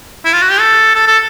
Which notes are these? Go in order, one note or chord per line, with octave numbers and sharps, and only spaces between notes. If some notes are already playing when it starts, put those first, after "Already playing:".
E4
F4
F#4
G4
A4
A4
A4